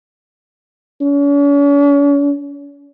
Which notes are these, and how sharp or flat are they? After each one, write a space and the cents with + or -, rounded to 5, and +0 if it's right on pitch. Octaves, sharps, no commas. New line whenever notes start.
C#4 +45